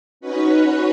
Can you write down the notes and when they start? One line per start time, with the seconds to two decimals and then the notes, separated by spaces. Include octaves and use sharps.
0.21 C#4 D#4 F#4 B4 C#5